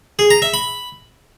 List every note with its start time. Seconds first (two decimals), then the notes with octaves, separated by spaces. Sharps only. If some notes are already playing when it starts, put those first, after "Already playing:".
0.19 G#4
0.30 A#5
0.42 E5
0.54 B5